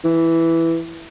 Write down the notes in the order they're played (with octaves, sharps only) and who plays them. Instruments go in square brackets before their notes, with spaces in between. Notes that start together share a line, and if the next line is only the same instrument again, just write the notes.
[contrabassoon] E3